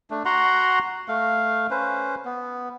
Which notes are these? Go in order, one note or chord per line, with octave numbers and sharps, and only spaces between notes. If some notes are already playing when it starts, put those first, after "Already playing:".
A3 D4
F#4 F#5 A#5 C6
A3 F5
C#4 B4 C5
B3